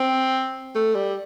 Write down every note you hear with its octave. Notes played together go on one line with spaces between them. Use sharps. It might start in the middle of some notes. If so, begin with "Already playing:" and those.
Already playing: C4
A3
G3